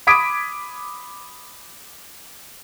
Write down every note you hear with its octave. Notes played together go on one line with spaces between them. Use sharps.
B5 D6 D#6 G#6 B6 D7